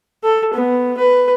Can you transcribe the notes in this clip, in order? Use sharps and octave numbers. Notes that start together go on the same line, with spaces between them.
A4
B3
B4